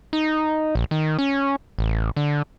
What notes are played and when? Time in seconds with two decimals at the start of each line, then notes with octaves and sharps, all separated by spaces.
0.13 D#4
0.75 A#1
0.91 D#3
1.19 C#4
1.79 A1
2.16 D3